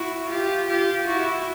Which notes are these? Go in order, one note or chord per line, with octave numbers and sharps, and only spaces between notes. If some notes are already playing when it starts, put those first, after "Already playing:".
Already playing: E4 F#4
F4 G4
F4 G4
E4 F#4